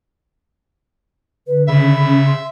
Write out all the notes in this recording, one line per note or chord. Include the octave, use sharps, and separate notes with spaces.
D3 B4
C#3 E5 B5
C6